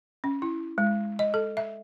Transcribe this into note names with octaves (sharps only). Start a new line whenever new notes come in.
C#4
E4
G#3
D#5
A4
E5